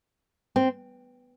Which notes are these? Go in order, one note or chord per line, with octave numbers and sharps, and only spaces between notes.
C4